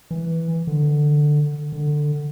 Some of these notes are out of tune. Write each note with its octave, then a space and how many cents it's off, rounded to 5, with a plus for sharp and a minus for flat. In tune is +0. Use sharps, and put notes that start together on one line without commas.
E3 -5
D3 +10
D3 +15